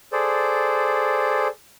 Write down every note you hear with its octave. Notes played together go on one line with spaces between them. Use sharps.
G#4 A4 C5 D5